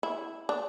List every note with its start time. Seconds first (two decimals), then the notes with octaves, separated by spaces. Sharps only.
0.03 E4
0.49 D4